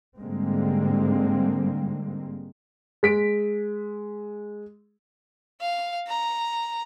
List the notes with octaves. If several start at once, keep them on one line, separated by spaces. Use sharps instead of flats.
G#2 D3 G3 G#3 A#3 C4
G#3 B6 D7
F5
A#5